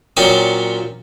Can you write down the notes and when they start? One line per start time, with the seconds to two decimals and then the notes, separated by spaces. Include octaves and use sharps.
0.17 A#2 F#3 C4 C#4 D5 D#6